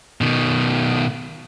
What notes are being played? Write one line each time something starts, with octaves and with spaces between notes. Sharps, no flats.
B2 D#3